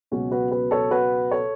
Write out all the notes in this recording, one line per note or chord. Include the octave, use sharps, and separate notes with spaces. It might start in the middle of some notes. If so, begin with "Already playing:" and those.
C#2 B2 F#3 C#4 F#4
F#4 B4
F#4 B4
A4 C#5
F#4 B4
A4 C#5